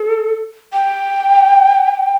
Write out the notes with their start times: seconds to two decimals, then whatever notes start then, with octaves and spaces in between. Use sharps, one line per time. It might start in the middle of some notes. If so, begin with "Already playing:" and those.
Already playing: A4
0.73 G5